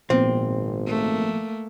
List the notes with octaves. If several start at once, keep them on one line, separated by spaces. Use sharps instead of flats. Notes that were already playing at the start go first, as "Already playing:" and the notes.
G#1 A#2 F3 B3 C4
A3 A#3